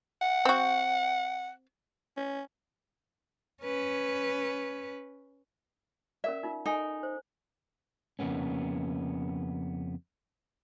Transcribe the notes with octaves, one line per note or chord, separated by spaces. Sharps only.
F#5
C4 F#4
C#4
C#4 B4
C#4 A#4 D5 E5
D#4 F4
D#4 A4 G#5
C5
F2 C#3 A#3 B3 C#4